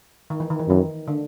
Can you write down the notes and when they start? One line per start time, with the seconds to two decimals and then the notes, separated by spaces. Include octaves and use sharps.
0.30 D#3
0.40 E3
0.50 D#3
0.59 E3
0.68 F#2 D#3
1.08 D3